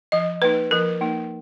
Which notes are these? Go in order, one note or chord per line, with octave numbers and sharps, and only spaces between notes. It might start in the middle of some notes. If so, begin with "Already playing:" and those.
F3 D#5
A#3 D#4 B4
F3 A#4
A#3 D#4